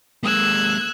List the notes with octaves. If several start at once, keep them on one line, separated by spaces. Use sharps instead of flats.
G#3 A#3 E6 F#6 G#6